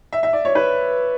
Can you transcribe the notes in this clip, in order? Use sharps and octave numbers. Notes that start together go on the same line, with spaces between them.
E5
E5
D5
C#5
B4